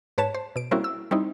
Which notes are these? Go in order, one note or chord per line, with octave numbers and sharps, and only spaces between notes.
G#2 B4 C#5 A5 E7
C5
B2 D7
G3 A#3 C4 C#4 E4 F#4
E6
G3 C4 D#4 E4